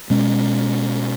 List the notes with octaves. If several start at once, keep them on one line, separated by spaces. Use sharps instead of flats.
B2 G#3 C#4